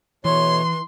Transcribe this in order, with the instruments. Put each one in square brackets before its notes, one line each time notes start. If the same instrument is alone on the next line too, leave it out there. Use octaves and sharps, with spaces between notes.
[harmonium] B2 A3 C#5 [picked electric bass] E3 [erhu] C6